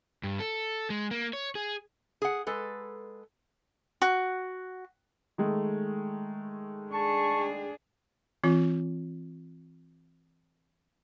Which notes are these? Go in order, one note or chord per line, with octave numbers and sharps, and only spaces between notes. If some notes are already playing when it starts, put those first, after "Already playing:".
G2
A4
G#3
A#3
C#5
G#4
G#4 F#5
G#3 A4 B4
F#4
D#3 G#3 A3
D4 G#4 A5 C#6
E3 C4 F4